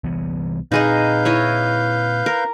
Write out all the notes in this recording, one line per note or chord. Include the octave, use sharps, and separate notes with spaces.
C2 E3 B3
A#2 C4 D#4 G#4 B4 D#5 F5 G6
E4 C#5 D#5
A#4